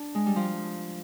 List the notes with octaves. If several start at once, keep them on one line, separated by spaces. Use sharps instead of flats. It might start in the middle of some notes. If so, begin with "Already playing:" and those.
Already playing: D4
G#3
G3
F3